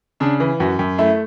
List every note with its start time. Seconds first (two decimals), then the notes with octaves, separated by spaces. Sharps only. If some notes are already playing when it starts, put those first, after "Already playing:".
0.20 C#3 D4
0.40 E3
0.60 F#2 F#4
0.79 F#2
0.98 A3 E4